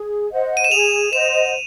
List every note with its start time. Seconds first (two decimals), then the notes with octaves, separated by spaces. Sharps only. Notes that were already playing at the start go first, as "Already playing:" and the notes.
Already playing: G#4
0.31 C5 D#5 F#5
0.57 D#7
0.64 E7
0.71 G#4 F7
1.12 C5 D#5 F#5 E7